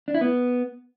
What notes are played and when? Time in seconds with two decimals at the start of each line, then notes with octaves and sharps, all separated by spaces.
0.08 D4
0.14 E4
0.21 B3